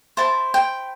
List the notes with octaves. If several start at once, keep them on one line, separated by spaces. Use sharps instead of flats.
E4 C5 A5
G5